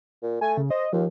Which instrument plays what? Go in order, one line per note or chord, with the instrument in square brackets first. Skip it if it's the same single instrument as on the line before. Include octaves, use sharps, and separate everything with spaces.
[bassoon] A#2
[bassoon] A3 [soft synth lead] G#5
[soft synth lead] C#3
[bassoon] C5 [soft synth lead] D#5
[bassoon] D#2 [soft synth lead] F3